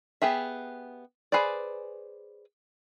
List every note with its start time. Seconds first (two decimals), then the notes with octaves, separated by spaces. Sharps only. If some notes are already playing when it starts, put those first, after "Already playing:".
0.22 B3 G4 G#4 E5
1.32 G#4 B4 C5 D5